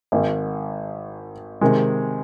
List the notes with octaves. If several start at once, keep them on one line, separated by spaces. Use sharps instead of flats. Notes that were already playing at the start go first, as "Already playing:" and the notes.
G#1 G#2 D#3
C3 D#3 G#3